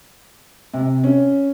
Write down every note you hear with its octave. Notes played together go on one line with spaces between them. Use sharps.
C3
C#4